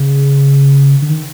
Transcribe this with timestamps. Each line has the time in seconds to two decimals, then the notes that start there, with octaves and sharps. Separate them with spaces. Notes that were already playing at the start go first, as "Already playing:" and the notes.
Already playing: C#3
1.02 D3
1.10 D#3